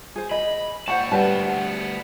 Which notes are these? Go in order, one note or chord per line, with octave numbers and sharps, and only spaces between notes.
G#4 C5
D#5 B5
A#2 C5 F#5 G5 A5 C#6
D2 G3 B3 B4 F#5 A5